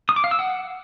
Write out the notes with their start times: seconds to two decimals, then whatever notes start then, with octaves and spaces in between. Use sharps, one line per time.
0.09 D#6
0.16 D6
0.24 F5
0.31 E6
0.39 F#5